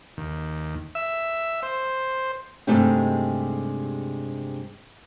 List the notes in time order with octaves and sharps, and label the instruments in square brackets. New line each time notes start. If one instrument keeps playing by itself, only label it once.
[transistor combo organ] D#2
E5
C5
[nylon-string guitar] G2 C3 G#3 A3 D#4 G5